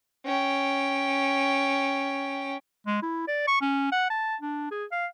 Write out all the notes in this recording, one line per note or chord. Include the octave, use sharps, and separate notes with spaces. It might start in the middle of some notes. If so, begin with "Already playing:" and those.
C#4 G5
G#3
E4
D5
C#6
C#4
F#5
A5
D4
G#4
F5